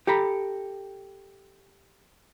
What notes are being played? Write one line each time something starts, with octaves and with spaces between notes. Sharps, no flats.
G4 A4 A#5 B5